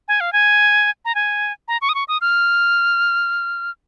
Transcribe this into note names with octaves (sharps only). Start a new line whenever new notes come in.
G#5
F5
G#5
A#5
G#5
A#5
C#6
D#6
C#6
D#6
F6